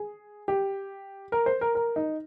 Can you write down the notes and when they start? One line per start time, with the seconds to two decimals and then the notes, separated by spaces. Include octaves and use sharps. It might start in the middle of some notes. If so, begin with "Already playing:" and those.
Already playing: G#4
0.48 G4
1.32 A#4
1.46 C5
1.61 A#4
1.75 A#4
1.96 D#4